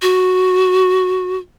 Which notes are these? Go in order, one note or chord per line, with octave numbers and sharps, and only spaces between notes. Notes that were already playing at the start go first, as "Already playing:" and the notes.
F#4